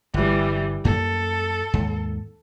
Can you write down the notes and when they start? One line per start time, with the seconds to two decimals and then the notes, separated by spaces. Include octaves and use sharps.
0.14 G1 E3 G3
0.85 F#2 A#3 A4
1.74 D#2 G#2